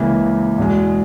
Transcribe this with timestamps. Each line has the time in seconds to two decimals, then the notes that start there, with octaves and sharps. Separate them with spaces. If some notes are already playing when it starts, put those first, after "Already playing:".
Already playing: C#2 C#3 E3 A#3
0.58 E2 B2 G#3